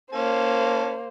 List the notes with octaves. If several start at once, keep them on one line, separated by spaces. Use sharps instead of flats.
A#3 C#4 C5 A5